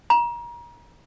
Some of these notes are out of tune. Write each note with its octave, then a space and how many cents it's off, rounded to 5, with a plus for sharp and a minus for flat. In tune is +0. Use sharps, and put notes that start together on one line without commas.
A#5 +30